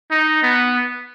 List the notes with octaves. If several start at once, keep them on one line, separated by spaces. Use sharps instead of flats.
D#4
B3